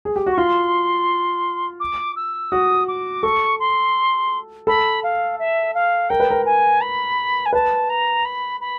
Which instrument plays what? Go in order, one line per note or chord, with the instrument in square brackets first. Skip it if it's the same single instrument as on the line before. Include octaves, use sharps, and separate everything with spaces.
[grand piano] G#4
G4
F#4
[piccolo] C#6
[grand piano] F4 [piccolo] C6
[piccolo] D6
E6
[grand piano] F#4 [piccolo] D#6
[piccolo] D6
[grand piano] A4 [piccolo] C#6
[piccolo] C6
[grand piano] A4 [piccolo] B5
[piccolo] F5
E5
F5
[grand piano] A#4 [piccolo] G5
[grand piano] B4
A#4
[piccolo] G#5
B5
G#5
[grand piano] B4 [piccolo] A5
[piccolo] A#5
B5
B5